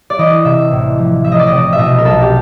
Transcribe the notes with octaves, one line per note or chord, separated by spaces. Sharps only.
D5
E3 D#5
C3 E5
A1
F3
F3 E5
D#5
D5
C3 D#5
E5
B2 D#5
A#4
B1 A4
G4